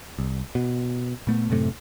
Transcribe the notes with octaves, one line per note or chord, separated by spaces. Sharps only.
C2
B2
A#2 A3 B3
F#2 A2 C3 A3